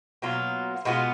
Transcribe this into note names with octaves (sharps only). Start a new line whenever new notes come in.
B2 F#3 A#3 F4
B2 G#3 B3 F4